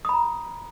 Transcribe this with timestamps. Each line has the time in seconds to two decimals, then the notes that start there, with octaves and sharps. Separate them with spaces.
0.05 D#6
0.09 B5
0.13 A#5